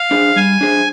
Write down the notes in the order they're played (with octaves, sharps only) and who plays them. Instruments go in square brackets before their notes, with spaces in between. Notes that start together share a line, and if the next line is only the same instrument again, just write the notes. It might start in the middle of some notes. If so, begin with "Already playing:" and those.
Already playing: [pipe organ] F5
[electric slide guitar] D4 G#4 C5
[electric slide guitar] G3 [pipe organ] G#5
[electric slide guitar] D4 G#4 C5